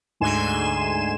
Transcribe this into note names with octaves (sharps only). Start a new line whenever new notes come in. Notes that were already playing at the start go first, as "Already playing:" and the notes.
D2 G#2 G#5 C6 E7